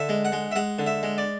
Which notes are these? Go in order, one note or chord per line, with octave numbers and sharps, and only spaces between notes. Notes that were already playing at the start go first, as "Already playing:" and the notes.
Already playing: D3 E5
G#3
F#5
G#3
E5
G#3 F#5
D3
E5
G#3
D5